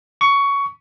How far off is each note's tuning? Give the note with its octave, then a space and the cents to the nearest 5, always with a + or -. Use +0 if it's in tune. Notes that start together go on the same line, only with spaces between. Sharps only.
C#6 +15